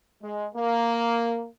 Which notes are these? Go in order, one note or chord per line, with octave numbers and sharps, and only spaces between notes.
G#3
A#3